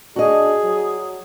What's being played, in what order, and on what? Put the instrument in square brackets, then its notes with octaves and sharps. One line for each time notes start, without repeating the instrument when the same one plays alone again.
[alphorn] D4 [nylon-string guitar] F#4 D#5 [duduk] G#4
[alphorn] F#3